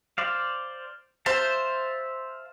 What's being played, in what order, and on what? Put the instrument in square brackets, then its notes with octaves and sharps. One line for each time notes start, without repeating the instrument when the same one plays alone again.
[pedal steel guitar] C5 D5 F5
[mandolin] C5 [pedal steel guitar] E5 F5 A5